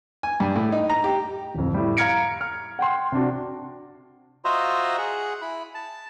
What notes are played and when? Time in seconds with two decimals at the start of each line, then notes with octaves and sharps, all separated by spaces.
0.23 G#5
0.40 G2
0.56 A2
0.72 D#4
0.90 A#5
1.04 G4
1.54 D1 F2
1.74 A2 G3
1.97 F5 A#5 F6 G#6 C#7 D7
2.41 F6
2.79 F#5 G5 C6
3.12 C3 D4 F#4
4.45 F4 F#4 C5 D#5 E5 A#5
4.98 G#4 F#5
5.42 E4 B5
5.75 A5